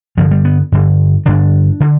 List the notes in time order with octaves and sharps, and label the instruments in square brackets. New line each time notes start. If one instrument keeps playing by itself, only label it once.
[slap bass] G2 D3 F3
G3
B3
G2 D3
G2 D3 D4
D3